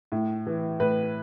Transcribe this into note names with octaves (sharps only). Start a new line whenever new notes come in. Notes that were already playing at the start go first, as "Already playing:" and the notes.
A2
E3
A2 B4